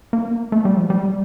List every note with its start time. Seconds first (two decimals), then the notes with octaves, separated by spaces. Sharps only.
0.13 A#3
0.52 A3
0.65 G3
0.77 F3
0.90 G3